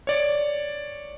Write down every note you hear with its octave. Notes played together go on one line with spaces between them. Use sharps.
C#5 D5